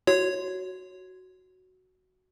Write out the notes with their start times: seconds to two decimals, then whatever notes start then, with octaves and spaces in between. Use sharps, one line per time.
0.07 F#4 C#5